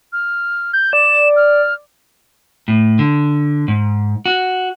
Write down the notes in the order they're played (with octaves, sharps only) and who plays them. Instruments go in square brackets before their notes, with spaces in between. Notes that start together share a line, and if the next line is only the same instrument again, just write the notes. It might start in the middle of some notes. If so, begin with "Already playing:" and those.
[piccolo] F6
[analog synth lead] G6
[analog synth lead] D5 [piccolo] E7
[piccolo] F6
[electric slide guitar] A2
D3
G#2
F#4